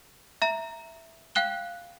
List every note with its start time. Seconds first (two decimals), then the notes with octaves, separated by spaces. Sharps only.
0.42 E5 A#5
1.35 F5 G5 F#6 G7